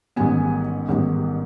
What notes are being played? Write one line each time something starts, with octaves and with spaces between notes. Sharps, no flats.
A1 G#2 D#3 G3 B3 G#5
A1 G#2 D#3 G3 B3